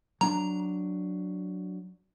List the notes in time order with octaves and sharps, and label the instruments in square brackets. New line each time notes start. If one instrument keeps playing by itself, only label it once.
[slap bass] F#3 D4 [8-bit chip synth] A#5